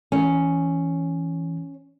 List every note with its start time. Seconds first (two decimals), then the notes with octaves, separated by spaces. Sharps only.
0.12 E3 C#4